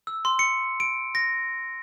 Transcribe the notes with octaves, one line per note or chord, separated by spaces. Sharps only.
E6
C6
C#7
D7
A#6